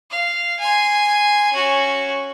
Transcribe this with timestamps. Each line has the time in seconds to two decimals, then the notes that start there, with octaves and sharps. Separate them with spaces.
0.11 F5
0.60 G#5 C6
1.52 C#4 F#4